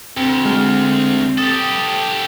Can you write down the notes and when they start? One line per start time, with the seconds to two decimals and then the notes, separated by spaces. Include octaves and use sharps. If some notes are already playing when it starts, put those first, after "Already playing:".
0.17 D2 C4
0.45 G#3 F6
1.38 G4 A4 D#6 A6